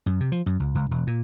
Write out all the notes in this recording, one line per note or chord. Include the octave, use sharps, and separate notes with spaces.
F#2
C3
F3
F#2
C#2
C#2
E1
A#2